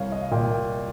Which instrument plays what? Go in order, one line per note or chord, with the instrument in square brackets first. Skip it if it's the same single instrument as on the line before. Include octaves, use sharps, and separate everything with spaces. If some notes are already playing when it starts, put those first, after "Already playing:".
Already playing: [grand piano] C2 C#5 F5
D#5
F5
A#2 D#5 G5